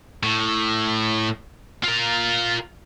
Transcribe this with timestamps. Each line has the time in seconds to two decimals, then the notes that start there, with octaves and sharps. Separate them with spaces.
0.23 A2
1.84 F4 A#4